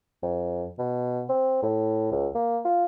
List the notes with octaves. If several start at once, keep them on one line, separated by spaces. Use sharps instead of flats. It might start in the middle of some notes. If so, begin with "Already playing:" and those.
F2
B2
C4
A2
C#2
A#3
F4